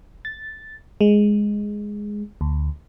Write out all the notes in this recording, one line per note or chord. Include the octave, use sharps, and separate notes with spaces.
A6
G#3
D2